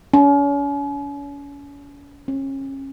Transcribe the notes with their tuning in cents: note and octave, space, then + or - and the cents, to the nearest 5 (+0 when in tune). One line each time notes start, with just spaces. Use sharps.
C#4 +40
C#4 -30